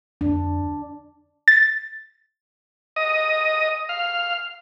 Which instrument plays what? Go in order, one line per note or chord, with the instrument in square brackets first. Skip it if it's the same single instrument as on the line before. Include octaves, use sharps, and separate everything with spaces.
[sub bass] F2 [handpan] D4
[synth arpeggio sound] A6
[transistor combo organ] D#5
F5